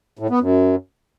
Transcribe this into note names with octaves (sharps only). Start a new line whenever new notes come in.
A2
B3
F#2